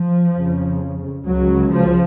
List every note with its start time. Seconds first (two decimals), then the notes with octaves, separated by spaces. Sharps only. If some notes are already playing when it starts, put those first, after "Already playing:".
Already playing: F3
0.34 F2 C#3
1.25 C#2 C#3 F#3
1.71 F3